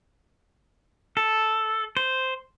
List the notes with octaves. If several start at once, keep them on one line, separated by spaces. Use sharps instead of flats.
A4
C5